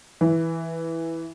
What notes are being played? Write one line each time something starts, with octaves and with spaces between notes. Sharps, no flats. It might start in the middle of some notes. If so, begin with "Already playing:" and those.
E3